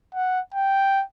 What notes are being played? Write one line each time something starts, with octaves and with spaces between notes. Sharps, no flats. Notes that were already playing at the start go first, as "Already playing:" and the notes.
F#5
G5